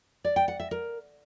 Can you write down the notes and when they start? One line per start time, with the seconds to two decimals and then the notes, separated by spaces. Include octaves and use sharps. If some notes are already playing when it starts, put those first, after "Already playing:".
0.24 D5
0.36 G5
0.48 F#5
0.60 E5
0.71 A#4